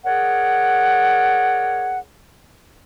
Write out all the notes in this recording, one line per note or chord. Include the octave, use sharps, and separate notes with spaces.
G#4 A#4 C#5 D5 F#5